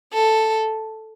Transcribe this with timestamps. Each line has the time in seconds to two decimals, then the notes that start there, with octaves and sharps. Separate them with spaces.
0.13 A4